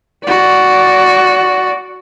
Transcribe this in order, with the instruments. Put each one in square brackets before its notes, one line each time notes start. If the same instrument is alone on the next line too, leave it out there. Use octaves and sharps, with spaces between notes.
[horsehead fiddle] F#4 D5